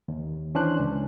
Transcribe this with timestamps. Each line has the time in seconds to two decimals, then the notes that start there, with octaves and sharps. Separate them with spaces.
0.08 D#2
0.55 E3 C#4 D4 C5 F#6
0.80 C#2